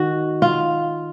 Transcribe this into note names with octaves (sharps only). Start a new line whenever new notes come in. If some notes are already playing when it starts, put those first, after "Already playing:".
Already playing: D#3 F#4
F4